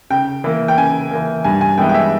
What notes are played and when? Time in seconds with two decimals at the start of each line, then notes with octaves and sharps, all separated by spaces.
0.10 C#3 G5
0.44 E3 A#3
0.68 G5
0.78 C#3 G#5
1.11 E3 A#3
1.44 G2 G#5
1.61 G#5
1.78 E3 G#3 B3 E4 G5
1.89 G5
1.94 E5